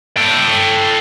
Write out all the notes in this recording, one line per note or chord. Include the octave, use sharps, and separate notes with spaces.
A4 G5